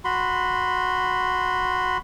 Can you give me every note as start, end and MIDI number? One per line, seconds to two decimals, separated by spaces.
0.05 1.98 66
0.05 1.98 83
0.05 1.98 84